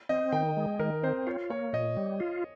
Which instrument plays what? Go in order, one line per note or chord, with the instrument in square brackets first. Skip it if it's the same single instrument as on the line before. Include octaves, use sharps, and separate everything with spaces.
[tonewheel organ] C4 [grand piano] D#5
[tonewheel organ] D#3 [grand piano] G5
[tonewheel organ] G#3
[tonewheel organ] D#3 [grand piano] A#4
[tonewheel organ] C4 [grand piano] C5
[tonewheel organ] F4 [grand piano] C#5
[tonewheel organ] A#3 [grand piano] C#5
[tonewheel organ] A#2 [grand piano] D#5
[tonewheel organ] G3
F4